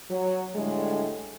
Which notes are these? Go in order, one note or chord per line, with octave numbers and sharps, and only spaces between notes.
F#3
A2 D3 G3 G#3